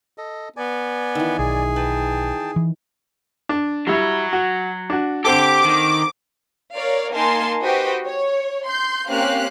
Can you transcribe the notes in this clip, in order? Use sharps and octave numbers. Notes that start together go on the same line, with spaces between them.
A4 D#5
B3 D5 G#5
D#3 E3
B1 G#4
B4 G5 A5
E3
D4
F#3 G3 E4 C#5
F#4
D4 F#4
D3 C4 G4 A4 D6
D#3
A#4 C#5 D5 F5
A#3 D#4 A#4 G#5 A5 C6
F#4 G4 B4 C5 D#5 G5
C#5
C6 G6
A#3 C4 C#4 G4 F5 F#6